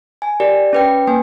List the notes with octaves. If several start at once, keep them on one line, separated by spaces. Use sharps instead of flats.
G#5
G4 A#4 D5
C#4 B4 G5
A#3 B4 G#5